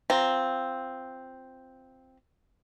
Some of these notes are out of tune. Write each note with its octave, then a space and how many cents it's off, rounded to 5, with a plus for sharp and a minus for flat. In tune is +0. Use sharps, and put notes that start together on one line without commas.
C4 +0 F4 +0 A#5 +0